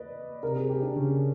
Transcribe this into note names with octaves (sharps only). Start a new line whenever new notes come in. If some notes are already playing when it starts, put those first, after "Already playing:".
Already playing: B4 D5 D#5
C3 A#4
G#4
G4
D4
C#3 C#4